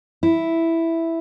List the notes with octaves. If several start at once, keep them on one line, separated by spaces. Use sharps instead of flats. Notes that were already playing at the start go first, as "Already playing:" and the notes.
E4